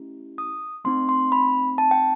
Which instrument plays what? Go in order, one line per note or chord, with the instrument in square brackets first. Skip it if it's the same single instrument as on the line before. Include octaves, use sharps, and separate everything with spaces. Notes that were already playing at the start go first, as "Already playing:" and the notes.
Already playing: [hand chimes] A3 C#4 E4 G4
D#6
A3 C4 D#4 C6
C6
B5
A5
G5